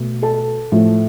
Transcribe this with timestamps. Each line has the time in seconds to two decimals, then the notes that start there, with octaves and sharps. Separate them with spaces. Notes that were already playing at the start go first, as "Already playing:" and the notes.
Already playing: B2 A3
0.22 A4 A5
0.72 A2 F3 A3